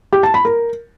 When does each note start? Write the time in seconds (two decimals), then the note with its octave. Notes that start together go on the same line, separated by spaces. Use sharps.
0.13 G4
0.23 A5
0.34 B5
0.45 A#4